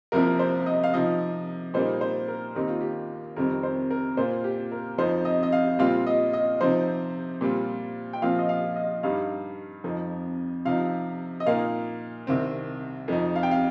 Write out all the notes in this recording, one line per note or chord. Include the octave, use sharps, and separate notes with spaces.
C2 C3 F3 A#3 A#4
C5
D#5
F5
C3 F3 D#4 D#5
A#2 G3 A#3 D#4 C5
C5
A#4
D#2 D#3 C4 D#4 G4
F4
G4
F2 C3 D#3 G3 C4 A#4
C5
A#4
A#2 A#3 F4 C5
G4
A#4
F2 F3 D#4 C5
D#5
D#5
F5
A#2 G3 C4 F4 F5
D#5
D#5
C3 F3 D#4 C5
A#2 G3 C4 F4
G5
A#2 F3 C4 F4 F5
D#5
F5
D#5
G2 G3 D#4 F5
F2 F3 D#4
C3 F3 D#4 F5
D#5
A#2 A#3 D#4 F5
C2 C3 D#3 C4
F2 F3 D#4
F5
G5
F5